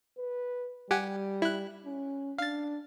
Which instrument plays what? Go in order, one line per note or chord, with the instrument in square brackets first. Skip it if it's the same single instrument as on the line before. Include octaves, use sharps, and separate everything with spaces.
[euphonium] B4
[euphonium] G3 [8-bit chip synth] G4 F#5 G#5
[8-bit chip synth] E4 F#6
[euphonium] C#4
[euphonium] D4 [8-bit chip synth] F5 A6